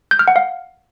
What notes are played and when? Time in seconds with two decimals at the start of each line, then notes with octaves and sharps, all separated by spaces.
0.11 G6
0.19 F6
0.28 F#5
0.36 F5